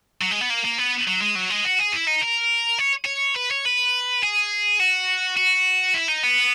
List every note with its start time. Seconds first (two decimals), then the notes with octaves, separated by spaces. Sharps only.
0.21 F#3
0.31 G#3
0.41 B3
0.50 A#3
0.65 A#3
0.79 B3
1.08 F#3
1.22 G#3
1.36 F#3
1.50 G#3
1.65 F#4
1.80 G#4
1.93 E4
2.08 D#4
2.22 A#4
2.79 C#5
3.05 C#5
3.36 B4
3.51 C#5
3.65 B4
4.23 G#4
4.79 F#4
5.37 F#4
5.94 E4
6.08 D#4
6.23 B3